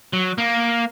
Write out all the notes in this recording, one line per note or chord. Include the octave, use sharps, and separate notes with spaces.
F#3
A#3